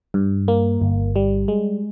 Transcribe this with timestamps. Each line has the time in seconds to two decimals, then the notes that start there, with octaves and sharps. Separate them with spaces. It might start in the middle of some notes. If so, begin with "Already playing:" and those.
0.14 G2
0.48 A#3
0.82 G1
1.16 G3
1.48 G#3